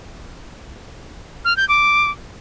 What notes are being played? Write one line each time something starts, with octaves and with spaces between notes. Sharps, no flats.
F6
G6
D6